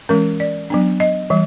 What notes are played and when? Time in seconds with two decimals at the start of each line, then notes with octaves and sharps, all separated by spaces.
0.09 E3 G#3 C#4 A#4
0.40 D5
0.70 F#3 B3 D4
1.00 D#5
1.30 E3 G3